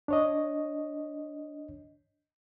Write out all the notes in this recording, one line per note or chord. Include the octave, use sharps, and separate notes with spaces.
D4 C#5 D#5